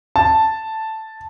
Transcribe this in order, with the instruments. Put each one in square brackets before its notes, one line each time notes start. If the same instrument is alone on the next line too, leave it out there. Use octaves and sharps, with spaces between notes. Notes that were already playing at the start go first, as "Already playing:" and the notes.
[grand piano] A5